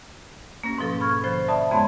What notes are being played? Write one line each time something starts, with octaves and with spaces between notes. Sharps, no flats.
A#3 C#4 A#6
G#2 B2 F3 A4
B5 C#6 F6 G#6
D3 F3 C5
D5 E5 A5 B5 D#6
F2 G#3 B3 C#5 C6